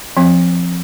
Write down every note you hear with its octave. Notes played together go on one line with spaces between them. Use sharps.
F3 C4